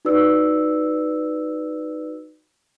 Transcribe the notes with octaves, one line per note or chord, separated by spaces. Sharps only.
D#4 F#4 B4 D5 E6